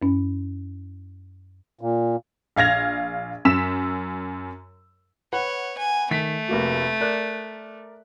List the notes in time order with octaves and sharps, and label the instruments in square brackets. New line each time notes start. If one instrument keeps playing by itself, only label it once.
[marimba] F#2 C#4
[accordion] A#2
[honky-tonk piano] A#1 F5 G#6 A#6 F7
F#2 E6 B6 E7
[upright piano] B4 F#5 [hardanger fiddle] C#5
[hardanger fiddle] G#5
[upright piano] D#3 B6 [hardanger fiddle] A3
[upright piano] F1 A#3 F#4
A#4 D5 F#6